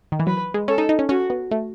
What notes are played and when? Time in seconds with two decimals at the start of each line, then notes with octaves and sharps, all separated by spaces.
0.12 D#3
0.20 E3
0.27 F#3 B4
0.54 G#3
0.68 C#4 A4
0.78 D#4
0.89 D#4
0.99 C#4
1.09 C#4 F#4
1.30 B3
1.51 A3